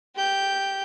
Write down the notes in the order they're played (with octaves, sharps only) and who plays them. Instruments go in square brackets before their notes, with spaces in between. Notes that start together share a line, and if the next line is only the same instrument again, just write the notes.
[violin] G4 G6